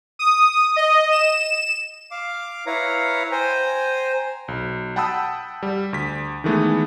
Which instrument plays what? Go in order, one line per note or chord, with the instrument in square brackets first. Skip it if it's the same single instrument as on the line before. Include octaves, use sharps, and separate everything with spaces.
[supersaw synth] D#6
D#5
E7
[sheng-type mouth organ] F5 D6
E4 B4 C#5 F5 A#5
C5 G5 G#5 A#5
[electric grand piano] B1
F#5 G5 A5 B5 D#6 E6
G3
D2 B6
D#3 E3 G#3 A3 B3